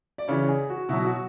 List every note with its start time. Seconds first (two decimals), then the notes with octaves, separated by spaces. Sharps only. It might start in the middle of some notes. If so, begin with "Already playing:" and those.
0.18 D5
0.28 C#3 E3 C#5
0.49 G#4
0.70 F#4
0.89 B2 F#3 E4
1.05 F#4